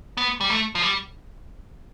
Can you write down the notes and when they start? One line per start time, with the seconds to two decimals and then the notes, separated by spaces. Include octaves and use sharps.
0.17 B3
0.41 G3
0.50 A3
0.75 F3
0.82 G3